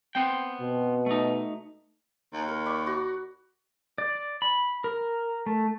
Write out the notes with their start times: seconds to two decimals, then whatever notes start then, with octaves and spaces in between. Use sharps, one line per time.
0.15 B3 C4 G5
0.61 B2
1.06 A3 D#4
2.33 D#2
2.48 A#4
2.66 D5 B5 C#6
2.87 F#4
3.98 D5
4.42 B5
4.84 A#4
5.46 A3